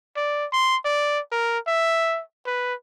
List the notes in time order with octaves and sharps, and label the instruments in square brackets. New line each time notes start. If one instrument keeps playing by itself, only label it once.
[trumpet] D5
C6
D5
A#4
E5
B4